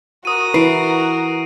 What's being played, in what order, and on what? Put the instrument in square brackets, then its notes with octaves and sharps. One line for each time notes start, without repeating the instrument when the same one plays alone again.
[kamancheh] F#4 A#4 [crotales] D#6 D#7
[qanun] E3 [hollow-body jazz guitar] B4 [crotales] C7 D7